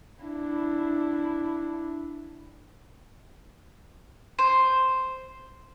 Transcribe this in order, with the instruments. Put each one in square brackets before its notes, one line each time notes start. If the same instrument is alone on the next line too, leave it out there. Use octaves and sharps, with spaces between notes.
[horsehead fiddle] D4 E4
[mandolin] C5